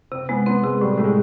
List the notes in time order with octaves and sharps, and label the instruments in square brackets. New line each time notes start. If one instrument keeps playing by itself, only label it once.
[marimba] C3 [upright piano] C4
[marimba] G#3 [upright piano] B3
[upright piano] B3 [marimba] C4
[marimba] C3 [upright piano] G#3
[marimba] A2 [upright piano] G3
[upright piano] G3
[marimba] A2 [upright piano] A3
[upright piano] G#3